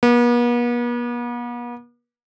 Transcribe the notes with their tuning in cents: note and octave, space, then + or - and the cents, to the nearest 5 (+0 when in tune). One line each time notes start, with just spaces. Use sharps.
B3 -45